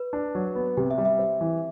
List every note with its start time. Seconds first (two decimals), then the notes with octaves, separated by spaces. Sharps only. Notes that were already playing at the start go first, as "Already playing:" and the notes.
Already playing: B4
0.13 D4
0.35 F#3
0.55 B3
0.77 C3 G4
0.91 E5
0.98 G3
1.05 E5
1.19 C4
1.41 E3